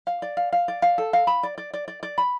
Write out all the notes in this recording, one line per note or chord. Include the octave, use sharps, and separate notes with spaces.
F5
D5
F5
F5
D5
F5
A4
F5
B5
D5
D5
D5
D5
D5
B5